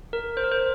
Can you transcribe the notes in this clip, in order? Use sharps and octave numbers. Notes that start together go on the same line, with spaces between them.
A#4
C5
A#4
C5